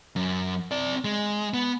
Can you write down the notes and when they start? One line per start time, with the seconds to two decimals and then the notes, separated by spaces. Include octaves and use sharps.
0.16 F#2
0.71 C4 D5
1.04 G#3
1.54 B3